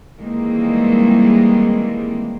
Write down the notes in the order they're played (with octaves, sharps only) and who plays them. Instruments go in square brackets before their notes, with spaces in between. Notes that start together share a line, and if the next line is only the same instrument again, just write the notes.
[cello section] D#3 E3 G3 G#3 A#3 C4